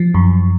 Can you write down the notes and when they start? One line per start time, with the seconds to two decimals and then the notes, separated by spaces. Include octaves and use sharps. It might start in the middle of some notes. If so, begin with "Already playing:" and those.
Already playing: F3
0.14 F#2